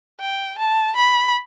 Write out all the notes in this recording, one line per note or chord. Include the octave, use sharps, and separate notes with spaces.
G5
A5
B5